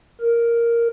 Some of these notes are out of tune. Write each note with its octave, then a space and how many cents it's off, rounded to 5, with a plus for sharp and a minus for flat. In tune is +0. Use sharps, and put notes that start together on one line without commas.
A#4 +0